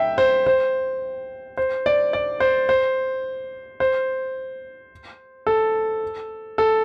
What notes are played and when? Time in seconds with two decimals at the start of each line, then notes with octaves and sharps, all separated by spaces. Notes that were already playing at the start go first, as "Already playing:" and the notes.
Already playing: E5 G5
0.18 C5
0.47 C5
1.57 C5
1.86 D5
2.13 D5
2.40 C5
2.69 C5
3.80 C5
5.47 A4
6.58 A4